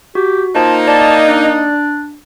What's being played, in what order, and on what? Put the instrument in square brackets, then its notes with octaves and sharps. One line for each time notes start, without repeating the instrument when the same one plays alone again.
[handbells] F#4 [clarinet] G4
[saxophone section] A#3 D#4 [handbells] F4 C5 [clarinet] A5
[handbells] D5 [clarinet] A5
[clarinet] D4